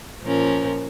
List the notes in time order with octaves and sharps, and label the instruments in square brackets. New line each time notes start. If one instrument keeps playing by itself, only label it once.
[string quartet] A#2 F3 C#4 A#4